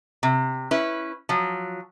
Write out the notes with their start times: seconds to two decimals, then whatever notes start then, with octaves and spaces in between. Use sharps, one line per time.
0.23 C3
0.71 C#4 E4 B4
1.29 F3 F#3